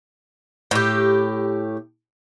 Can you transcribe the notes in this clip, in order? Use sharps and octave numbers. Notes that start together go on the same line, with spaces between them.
A2 G4